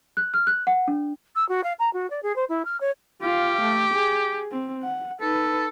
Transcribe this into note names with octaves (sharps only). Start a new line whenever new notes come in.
F#6
F6
F#6
F#5
D4
E6
F#4
F5
A#5
F#4
D5
G#4
C5
E4
F6
C#5
F4 G4 F5
A3
G#4
C4
F#5
D#4 A4 B4